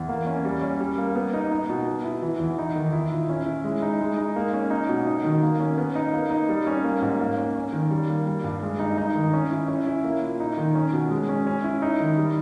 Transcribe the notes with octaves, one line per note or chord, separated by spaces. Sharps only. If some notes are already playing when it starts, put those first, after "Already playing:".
Already playing: E2
A#3
C#4
G3
C#4
G3
A#3
B3
D#4
D#4
B2
B3
E4
E3
E2
D#4
D#3
E4
A#2
C#4
E4
G#3
D#4
G#3
D#4
A#3
C#4
D#4
B2
D#4
D#3
A#3
C#4
B3
D#4
A#3
D#4
G3
C#4
A#3
G#2
A#3
C#4
C#4
D#3
G3
A#3
G3
G2
G#3
D#4
D#4
D#3
C#4
E4
C#4
E4
A#3
A#2
D#4
D#3
C#4
B2
G#3
C#4
C#4
E4
D#4
D#3
G3